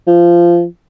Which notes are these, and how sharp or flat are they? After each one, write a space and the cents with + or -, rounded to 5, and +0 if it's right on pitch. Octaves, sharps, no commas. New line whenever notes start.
F3 -20